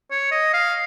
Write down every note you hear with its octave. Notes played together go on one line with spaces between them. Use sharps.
C#5
D#5
F5